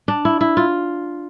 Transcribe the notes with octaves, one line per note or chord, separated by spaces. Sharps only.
D4
E4
E4
F4